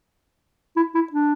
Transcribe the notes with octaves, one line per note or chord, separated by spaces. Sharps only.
E4
E4
D4